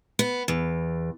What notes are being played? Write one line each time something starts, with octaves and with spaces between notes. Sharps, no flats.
B3
E2